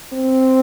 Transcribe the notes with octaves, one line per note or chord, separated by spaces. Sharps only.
C4